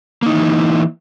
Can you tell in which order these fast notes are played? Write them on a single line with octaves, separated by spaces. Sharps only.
A#3 D#4 E4 E3